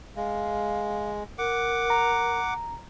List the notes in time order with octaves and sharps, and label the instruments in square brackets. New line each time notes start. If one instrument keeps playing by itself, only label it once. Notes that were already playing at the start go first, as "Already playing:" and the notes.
[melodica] G#3 [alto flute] F5
[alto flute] A#4 [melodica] F#5 D6
[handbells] A#5